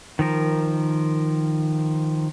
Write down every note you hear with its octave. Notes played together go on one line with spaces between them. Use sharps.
D#3 F3 A#4